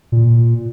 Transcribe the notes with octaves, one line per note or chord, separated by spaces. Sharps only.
A#2